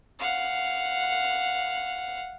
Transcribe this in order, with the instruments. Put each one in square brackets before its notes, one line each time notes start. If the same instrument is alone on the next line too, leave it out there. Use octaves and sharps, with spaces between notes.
[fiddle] F5 F#5